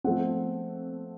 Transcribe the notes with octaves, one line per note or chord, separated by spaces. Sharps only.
F3 A3 C4 F#5